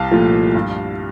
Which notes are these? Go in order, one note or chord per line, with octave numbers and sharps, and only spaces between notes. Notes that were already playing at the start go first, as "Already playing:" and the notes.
Already playing: C2 F5 A5
A#2 F3 A3
G2